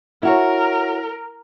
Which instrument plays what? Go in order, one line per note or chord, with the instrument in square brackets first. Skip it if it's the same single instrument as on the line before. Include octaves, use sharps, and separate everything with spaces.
[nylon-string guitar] E4 F#4 C#5 [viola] A#4